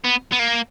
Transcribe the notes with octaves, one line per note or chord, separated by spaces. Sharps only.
B3
B3
A#3